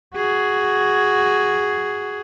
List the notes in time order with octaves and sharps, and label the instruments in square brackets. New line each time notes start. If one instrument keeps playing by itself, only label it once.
[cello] F#4 G#4